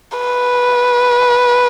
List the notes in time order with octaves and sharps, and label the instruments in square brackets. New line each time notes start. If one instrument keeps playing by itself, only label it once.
[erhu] B4